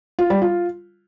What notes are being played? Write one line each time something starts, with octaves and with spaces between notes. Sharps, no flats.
F4
G3
F4